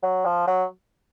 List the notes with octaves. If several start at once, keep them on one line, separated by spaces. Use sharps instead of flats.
F#3
F3
F#3